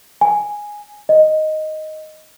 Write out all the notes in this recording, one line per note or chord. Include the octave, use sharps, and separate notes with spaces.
G#5
D#5